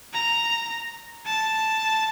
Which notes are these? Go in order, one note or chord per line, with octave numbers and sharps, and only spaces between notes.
A#5
A5